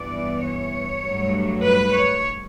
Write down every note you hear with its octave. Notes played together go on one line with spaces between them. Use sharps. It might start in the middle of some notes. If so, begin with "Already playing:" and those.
Already playing: G2 E3 B3 D5
C#5
G2 F#3 A3
B4
C#5